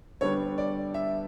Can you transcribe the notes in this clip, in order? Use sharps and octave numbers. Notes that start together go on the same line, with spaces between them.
D3 G3 B3 D4 A4 C#5
D5
E5